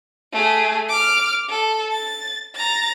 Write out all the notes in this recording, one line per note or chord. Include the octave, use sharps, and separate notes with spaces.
A3 G#4
D6 F6
A4
A6
A#5 A6